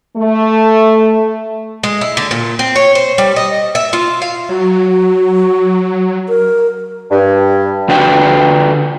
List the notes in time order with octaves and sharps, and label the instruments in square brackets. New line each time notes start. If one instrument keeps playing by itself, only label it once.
[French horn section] A3
[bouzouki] G#3
E4
D3
A#2
C4
C#5
C5
G3
D#5
E5
F4
F5
[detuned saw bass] F#3 [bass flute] F#4
[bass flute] A#4
[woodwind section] G2
[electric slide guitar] D3 D4 F#4 B4 E5 G5